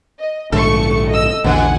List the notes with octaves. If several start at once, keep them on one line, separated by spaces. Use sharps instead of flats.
D#5
A#1 G#2 D3 A3 A4 C#6 C#7
D#5 E6
A#1 E2 B2 D3 F#5 G#5